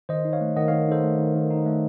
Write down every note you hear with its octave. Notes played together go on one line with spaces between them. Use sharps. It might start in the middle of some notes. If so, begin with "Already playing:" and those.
D#3 C5 D#5
D#4
C#5 F5
A3
D#3 D#5 F#5
C#5 F5
D#3
D#4 A4 C5
A3
D#3
D#3
D#4
A3